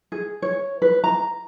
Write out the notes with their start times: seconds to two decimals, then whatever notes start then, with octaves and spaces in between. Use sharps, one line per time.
0.12 G#4
0.42 C#5
0.82 B4
1.04 A#5